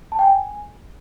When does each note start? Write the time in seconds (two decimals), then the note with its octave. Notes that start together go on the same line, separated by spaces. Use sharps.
0.12 A5
0.19 G5
0.26 G#5